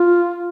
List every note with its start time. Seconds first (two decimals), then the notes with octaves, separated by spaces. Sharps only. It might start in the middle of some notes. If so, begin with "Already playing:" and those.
Already playing: F4